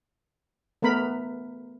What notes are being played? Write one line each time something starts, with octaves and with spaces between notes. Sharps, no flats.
A3 B3 A#4 B5